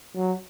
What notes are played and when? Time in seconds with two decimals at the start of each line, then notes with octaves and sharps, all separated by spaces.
0.16 F#3